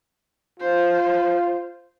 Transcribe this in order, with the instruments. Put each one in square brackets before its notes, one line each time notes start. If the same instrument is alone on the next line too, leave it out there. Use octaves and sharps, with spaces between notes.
[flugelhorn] F4 [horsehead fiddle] C5